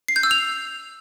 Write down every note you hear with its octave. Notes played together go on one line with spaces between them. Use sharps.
C7
G6
E6
F7